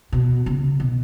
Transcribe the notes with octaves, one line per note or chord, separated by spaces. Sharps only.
B2
C#3
B2